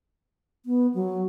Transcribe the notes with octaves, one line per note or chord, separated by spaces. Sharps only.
B3
F#3